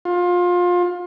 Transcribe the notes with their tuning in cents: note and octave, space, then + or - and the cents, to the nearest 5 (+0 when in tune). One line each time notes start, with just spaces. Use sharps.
F4 +25